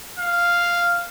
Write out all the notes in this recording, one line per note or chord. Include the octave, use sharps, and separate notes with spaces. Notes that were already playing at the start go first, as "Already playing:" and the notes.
F5